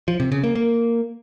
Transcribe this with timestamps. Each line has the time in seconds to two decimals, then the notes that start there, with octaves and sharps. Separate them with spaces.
0.08 F3
0.20 C3
0.32 C#3
0.44 A#3
0.55 A#3